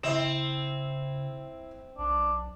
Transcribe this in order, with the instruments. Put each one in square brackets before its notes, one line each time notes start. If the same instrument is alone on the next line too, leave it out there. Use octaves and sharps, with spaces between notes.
[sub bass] C#3 [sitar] C4 [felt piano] E4 E7
[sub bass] B1 [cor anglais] D4